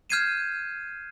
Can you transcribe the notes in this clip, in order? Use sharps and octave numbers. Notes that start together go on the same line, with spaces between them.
F6 G6 G#6 C7 D#7 E7